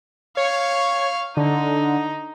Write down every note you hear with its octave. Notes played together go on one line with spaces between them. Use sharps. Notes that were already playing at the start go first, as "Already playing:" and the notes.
C#5 F5 C#6
D3 D#4